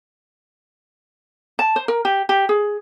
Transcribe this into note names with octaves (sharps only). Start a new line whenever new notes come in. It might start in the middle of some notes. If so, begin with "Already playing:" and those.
A5
C5
A#4
G4
G4
G#4